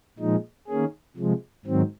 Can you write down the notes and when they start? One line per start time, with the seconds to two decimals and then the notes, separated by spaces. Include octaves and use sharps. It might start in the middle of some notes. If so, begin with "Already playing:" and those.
0.19 A#2 F3 G#3 D#4
0.68 D#3 A#3 C#4 G#4
1.16 C3 F3 G#3
1.65 G#2 D#3 F#3 C4